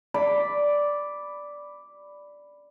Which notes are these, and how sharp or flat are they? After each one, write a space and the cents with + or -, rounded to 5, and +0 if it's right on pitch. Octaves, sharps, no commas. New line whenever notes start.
D5 -5 B5 +0